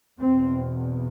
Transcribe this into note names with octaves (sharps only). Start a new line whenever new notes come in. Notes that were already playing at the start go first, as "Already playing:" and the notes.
E2 B2 C4